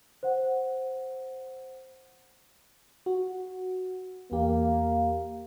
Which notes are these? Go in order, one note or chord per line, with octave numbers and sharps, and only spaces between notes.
C5 F#5
F#4
E2 A#3 G4